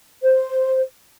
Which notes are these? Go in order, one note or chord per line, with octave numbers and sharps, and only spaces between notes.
C5